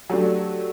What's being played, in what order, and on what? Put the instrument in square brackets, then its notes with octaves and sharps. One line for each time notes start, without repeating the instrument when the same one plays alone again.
[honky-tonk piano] F#3 A3 D4 [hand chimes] G4